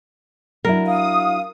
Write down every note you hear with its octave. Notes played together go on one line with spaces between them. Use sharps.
F#3 D4 E4 A#4
F5 D#6